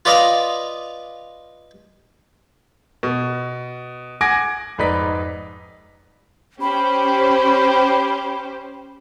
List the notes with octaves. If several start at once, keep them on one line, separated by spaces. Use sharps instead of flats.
F4 B4 D5 D#5 F5
B2
F#5 G#5 D6 G#6 A#6 D7
F1 G#2 D#4 B4 D5 B6
C#4 G4 C5 B5